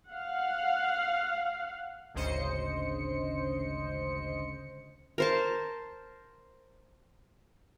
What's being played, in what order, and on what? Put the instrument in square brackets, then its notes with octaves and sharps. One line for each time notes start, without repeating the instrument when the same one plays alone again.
[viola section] F5 F#5
[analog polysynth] G#1 D2 C#3 C5 D#5 C#7
[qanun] A#4 C5 A5